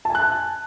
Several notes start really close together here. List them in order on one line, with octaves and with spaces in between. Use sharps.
A5 G#5 F#6